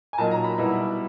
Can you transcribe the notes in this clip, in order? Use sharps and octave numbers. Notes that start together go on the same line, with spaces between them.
G#5
A#2 F#3 A#3 D#4 A5
A#5
B5
B2 G3 B3 E4